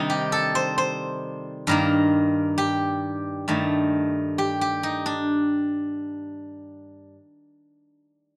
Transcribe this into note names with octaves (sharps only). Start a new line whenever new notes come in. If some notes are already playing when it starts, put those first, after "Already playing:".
Already playing: C3 D#3 G3 D#4
G4
A4
C5
C5
G2 D#3 A#3 A#4
G4
G2 D#3 A3
G4
G4
D#4
D4